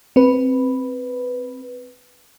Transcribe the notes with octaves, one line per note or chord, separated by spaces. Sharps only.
C4 B4